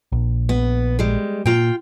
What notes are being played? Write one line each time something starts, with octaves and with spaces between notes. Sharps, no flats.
A#1
B3
G3 G#3
A#2 F4 G5